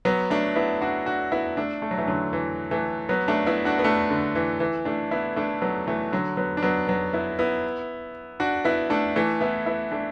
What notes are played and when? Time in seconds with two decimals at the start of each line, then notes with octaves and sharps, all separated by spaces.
0.05 F#3 B3
0.30 A3 D4
0.56 B3 E4
0.81 D4 F#4
1.06 D4 F#4
1.32 B3 E4
1.57 A3 D4
1.82 A3
1.91 F#3
1.98 E3 A3
2.07 D3 F#3
2.33 E3
2.71 E3 A3
3.09 F#3 B3
3.28 A3 D4
3.46 B3 E4
3.65 D4 F#4
3.79 B3
3.84 A3 D4
4.10 D3
4.35 E3
4.60 E3
4.85 A3 D4
5.11 B3 E4
5.36 A3 D4
5.61 F#3 B3
5.87 E3 A3
6.12 D3 F#3
6.37 F#3 B3
6.57 D4
6.62 F#3 B3
6.88 F#3 B3
7.13 B3 E4
7.39 B3 E4
8.40 D4 F#4
8.65 B3 E4
8.90 A3 D4
9.16 E3 A3
9.41 B3 E4
9.66 B3 E4
9.92 A3 D4